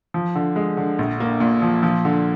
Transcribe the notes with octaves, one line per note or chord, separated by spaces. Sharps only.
F3
D3
G#3
D3
A#1
A#3
A#2
F3
F3
D3